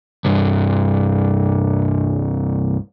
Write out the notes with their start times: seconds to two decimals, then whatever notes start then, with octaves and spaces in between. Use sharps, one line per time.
0.25 C2 G2